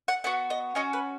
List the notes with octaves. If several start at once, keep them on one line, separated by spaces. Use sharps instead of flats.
F#5
B3 F#4 F#5
D#5
C#4 F#4 D#5
B4